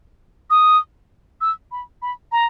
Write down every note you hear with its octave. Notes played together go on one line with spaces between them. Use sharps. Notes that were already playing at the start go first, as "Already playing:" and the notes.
D#6
E6
B5
B5
A#5